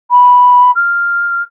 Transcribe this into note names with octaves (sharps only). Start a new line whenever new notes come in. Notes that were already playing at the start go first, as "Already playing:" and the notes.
B5
F6